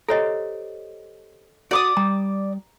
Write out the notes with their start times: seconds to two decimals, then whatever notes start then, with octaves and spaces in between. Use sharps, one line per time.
0.09 G4 A4 C5 C#5 D#5 A#5
1.71 F#4 D5 D6 D#6
1.97 G3 A#5